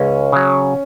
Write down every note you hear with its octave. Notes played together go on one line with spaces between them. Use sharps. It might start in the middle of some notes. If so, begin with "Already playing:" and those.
Already playing: C#2 C#4
C#3 F#3